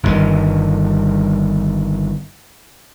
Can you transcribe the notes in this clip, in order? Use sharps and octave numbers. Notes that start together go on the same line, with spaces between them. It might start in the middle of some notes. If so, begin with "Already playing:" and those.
G1 G2 B2 D#3